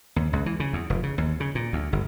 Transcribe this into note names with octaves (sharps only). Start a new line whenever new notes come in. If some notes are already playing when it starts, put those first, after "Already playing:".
D#2
C#2
E3
C#3
E2
F1
C#3
D#2
C#3
A#2
D2
G1